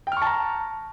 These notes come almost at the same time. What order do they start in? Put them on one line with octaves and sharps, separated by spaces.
G5 F6 C#6 A5 A#5